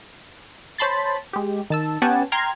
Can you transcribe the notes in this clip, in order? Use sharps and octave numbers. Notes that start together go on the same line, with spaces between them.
C5 C#5 A5 B5 C6 A6
G#3 G4
D#3 A5 E6
B3 C#4 G4 F#5 G#5 A5
G5 A#5 C6 F6 G#6